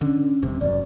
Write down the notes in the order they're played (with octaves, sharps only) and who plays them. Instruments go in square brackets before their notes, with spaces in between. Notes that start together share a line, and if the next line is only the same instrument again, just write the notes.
[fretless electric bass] D3 [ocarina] C#4
[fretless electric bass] D#1 C3
[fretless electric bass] F#1 F#2 [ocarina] D5